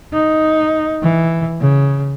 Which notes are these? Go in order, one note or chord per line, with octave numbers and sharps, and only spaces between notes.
D#4
E3
C#3